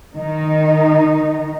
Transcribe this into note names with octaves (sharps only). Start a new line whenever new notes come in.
D#3 D#4